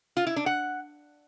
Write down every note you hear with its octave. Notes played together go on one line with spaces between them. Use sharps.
F4
E4
D4
F#5